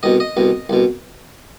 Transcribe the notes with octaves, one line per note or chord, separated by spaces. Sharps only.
C2 B2 D#5
D#5
C2 B2
C2 B2